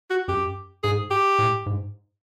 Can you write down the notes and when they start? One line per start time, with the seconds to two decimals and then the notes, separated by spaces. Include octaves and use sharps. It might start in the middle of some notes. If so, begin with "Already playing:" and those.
0.10 F#4
0.28 F#2 G4
0.83 G#2 G#4
1.11 G4
1.39 A2
1.66 G#2